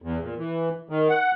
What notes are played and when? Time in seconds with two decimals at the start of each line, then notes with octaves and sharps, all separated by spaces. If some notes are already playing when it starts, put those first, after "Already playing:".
0.02 E2
0.21 A#2
0.38 E3
0.89 D#3
1.09 F#5